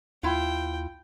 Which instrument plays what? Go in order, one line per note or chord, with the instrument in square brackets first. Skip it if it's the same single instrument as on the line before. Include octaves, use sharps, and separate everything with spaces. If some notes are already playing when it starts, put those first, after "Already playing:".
[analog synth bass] D#2 [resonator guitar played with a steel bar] E4 F4 [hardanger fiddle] G5